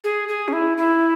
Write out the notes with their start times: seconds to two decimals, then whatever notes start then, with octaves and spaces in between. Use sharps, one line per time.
0.04 G#4
0.28 G#4
0.48 C#4
0.53 E4
0.77 E4